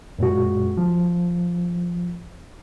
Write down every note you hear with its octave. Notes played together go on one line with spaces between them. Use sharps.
F#2 A#2 G#3 F#4
F3